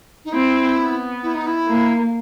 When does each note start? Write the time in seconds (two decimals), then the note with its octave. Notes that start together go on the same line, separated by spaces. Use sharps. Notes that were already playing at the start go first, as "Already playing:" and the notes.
0.25 D#4
0.32 C4 E4
0.78 B3
1.23 E4
1.34 D#4
1.46 E4
1.67 A#3